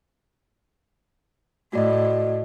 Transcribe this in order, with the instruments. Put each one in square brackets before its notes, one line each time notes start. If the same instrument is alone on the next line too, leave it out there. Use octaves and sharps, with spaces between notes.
[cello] A2 [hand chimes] F#4 D5 D#5